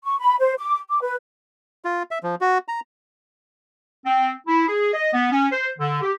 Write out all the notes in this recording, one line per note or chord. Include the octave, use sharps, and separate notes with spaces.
C#6
B5
C5
D6
D6
B4
F4
E5
F3
F#4
A#5
C4
E4
G#4
D#5
B3
C#4
C5
D3
G4